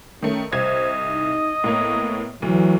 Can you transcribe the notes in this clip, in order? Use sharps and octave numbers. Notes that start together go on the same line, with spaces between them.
D#3 A3 C#4
C2 C5 D#5 G#6
D#4
A2 A#3 B3 C#5
D2 E3 F#3